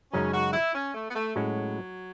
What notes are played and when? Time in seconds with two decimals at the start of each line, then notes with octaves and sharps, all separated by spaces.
0.12 F#2 C#3 G#3 C#4 D#4
0.34 F#4
0.53 E4
0.74 C#4
0.95 A3
1.10 B3
1.16 A3
1.36 A2 F#3 G#3 C#4 F#4